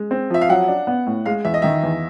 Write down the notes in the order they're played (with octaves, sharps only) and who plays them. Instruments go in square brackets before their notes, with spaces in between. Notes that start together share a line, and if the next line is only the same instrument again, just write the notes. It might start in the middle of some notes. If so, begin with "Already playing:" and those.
Already playing: [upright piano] G#3
C4
[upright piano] F3 [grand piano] E5
[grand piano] F5
[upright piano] F#3 [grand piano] F#5
[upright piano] D4
B3
A2
[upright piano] G#3 [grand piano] F5
[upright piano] E2 [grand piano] E5
[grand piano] D#5
[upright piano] D#3 [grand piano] E5
[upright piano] E2